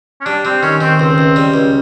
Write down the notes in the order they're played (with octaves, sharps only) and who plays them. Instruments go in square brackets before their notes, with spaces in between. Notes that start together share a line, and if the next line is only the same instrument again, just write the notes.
[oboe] C#4
[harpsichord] G3 [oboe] D4
[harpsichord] G3 [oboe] C4
[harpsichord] D#3 [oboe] C#4
[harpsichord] D#3 [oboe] C4
[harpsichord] C#2 [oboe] C4
[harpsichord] C#2
G3
C#2